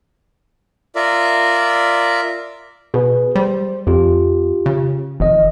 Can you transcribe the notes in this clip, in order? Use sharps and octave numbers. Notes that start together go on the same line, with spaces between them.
F4 A#4 D5 E5
B2 G#4 B4
G3 C5
F2 F4 G4
C#3
F1 D#3 D#5